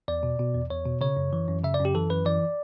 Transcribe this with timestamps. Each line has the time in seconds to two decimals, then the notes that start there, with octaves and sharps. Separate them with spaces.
0.08 E2 D5
0.23 B2
0.39 B2
0.54 E2
0.70 E2 C#5
0.85 B2
1.01 C#3 C#5
1.17 F#2
1.33 E3
1.48 F#2
1.64 C#3 E5
1.74 D5
1.79 F#2
1.85 G4
1.95 E3 A4
2.10 F#2 B4
2.26 E3 D5